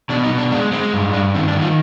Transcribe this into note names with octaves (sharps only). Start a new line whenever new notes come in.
B2 D4
D#4
B2
D4
G#3 D4
G#3 C4
G2
G2 D4
D#3 C4
D4
D#3
F4